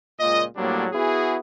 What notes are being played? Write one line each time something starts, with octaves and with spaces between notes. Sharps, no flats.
C#2 A#2 D#5
A2 F#3 G3 A#3 C4 D4
B3 E4 F#4 G#4